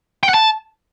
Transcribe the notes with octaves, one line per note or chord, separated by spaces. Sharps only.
G5
F#5
A5